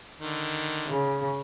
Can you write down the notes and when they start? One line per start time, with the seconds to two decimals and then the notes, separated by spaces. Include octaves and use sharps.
0.20 D3 D#3
0.88 C#3